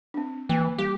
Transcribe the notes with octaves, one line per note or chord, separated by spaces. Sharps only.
C4 D4
E3 A#3
G3 G4